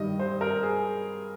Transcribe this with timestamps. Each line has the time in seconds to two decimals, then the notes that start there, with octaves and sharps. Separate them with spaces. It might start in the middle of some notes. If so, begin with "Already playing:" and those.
Already playing: G2 D#3 G3 D#5
0.19 C5
0.41 A#4
0.63 G#4